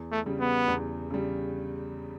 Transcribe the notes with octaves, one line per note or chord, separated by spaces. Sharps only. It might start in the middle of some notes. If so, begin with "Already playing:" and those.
Already playing: E2
A3
C#3 G3
B3
E2
C#3 G3